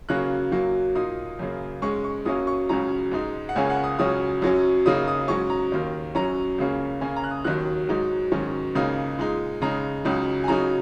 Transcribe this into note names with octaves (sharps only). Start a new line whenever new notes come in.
C#3 F#3 A#3 C#4 F#6
F#2 F#3 A#3
A#2 A#3 D#4 D#6
F#2 C#3 A#3
G#2 G#3 C#4 C#6
C#6
F#2 F#3 A#3 C#4 D#6
C#6
C#2 C#3 F#3 C#4 A#5
G#2 G#3 D#4
F#5
C#2 C#3 A#3 C#4 G#5
F#5
D#6
C#2 C#3 F#3 C#4 D#6
F#2 F#3 C#4
F#2 C#3 F#3 A#3 D#4 D#6
D#6
G#2 F#3 C#4 C#6
A#5
D#2 D#3 A#3
F#2 F#3 C#4 A#5
C#2 C#3 A#3 C#4
C#3 A#3 C#4 G#5
A#5
F#6
D#6
D#2 D#3 F#3 F#6
G#2 F#3 D#4
G#2 D#3 F#3 C#4
C#2 C#3 A#3 D#4 D#6
A#2 G#3 D#4
C#3 G#3 D#4 A#5
C#2 C#3 F#3 D#4
G#5
C#3 F#3 D#4 A#5